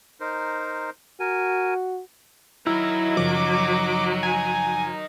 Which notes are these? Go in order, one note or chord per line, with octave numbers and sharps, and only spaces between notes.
D#4 A#4 C5
F#4 A#4 G#5
F#3 D#4 E4 A#4
F#2 C#3 F3 D6
G#5